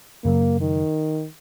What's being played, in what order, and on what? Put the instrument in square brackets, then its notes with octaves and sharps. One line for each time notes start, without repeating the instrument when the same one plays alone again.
[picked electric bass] F#2 C#3 F#3 [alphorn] A#3
[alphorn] D#3